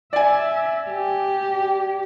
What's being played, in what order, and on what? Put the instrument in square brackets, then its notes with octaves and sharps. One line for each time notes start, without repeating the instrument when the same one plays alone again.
[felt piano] D5 G#5 [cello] E5
[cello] G4